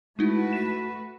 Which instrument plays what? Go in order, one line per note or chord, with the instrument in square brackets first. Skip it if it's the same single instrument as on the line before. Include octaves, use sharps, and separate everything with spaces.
[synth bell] G#3 D#4 E4 [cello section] A3 F#4 B4
[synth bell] B6 E7